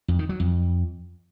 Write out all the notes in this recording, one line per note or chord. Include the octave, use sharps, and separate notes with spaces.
F2
D#3
F#3
F2